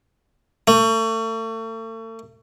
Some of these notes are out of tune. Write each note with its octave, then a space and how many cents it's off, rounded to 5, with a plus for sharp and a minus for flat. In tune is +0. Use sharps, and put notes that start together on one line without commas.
A3 +40